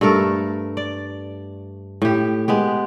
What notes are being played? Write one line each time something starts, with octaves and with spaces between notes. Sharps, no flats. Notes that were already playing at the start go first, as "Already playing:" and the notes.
G2 A3 A4 A#4
D5
A2 G4
G#3 B3 G4